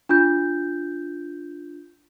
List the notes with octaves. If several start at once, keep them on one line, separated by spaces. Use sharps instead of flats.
D4 F4 G6